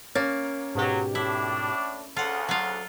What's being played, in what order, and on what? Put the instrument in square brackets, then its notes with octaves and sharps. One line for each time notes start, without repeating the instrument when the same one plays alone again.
[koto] A#3 [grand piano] C#4 A6
[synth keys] G#2 B2 G4 [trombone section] F#3
[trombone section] A2 D4 [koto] E4
[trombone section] D2 C#3 [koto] F4 [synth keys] A4 F#5
[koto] F#3 F4